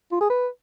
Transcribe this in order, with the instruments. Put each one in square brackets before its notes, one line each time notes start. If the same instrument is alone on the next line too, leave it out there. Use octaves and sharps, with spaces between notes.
[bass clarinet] F4
G#4
B4